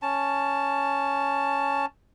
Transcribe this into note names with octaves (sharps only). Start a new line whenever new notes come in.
C#4 A5